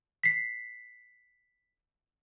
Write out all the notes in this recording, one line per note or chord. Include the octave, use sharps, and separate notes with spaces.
B6 C7